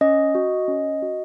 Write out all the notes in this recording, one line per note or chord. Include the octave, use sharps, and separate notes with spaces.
C#4 D#5
F#4
C#4
F#4